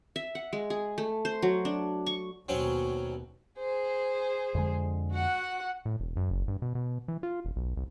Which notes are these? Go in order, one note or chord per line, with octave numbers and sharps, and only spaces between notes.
E5
F#5
G#3
G#4
A3
C5
F#3
D4
C#6
D#2 B2 F#3 C4 C#4
G#4 C5
F2 D3 G#3
F#4 F#5
A2
E1
F#2
F#1
G2
B2
B2
E3
F4
E1
B1
C2